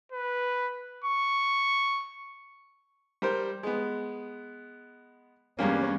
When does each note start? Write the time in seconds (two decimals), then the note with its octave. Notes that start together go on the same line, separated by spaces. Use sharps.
0.12 B4
1.04 C#6
3.22 G3 A#4 C5
3.63 G#3 B3
5.59 E2 G2 G3 A#3 C#4